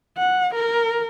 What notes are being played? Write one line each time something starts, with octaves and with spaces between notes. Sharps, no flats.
F#5
A#4